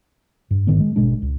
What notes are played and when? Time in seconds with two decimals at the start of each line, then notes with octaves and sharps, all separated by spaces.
0.51 G2
0.67 G#1 G#2 D#3 B3
0.80 G#3
0.96 G#1 B2 G#3 D4
1.22 C#2